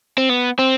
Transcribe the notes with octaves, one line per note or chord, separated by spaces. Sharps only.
C4
B3
C4